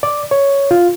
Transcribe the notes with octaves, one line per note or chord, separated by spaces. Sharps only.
D5
C#5
F4